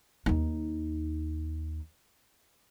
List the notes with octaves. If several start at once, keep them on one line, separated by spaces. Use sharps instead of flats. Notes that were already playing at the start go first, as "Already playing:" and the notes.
D#2 D#4